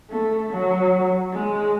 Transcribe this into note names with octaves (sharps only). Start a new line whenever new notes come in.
A3
F#3
G#3